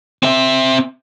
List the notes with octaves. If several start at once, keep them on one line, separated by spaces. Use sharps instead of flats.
C4 E5